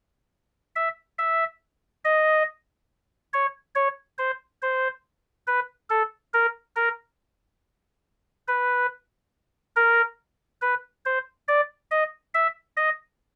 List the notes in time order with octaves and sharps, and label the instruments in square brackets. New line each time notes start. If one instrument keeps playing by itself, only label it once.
[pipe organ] E5
E5
D#5
C#5
C#5
C5
C5
B4
A4
A#4
A#4
B4
A#4
B4
C5
D5
D#5
E5
D#5